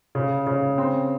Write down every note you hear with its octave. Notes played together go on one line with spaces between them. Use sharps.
C#3
C#3
C4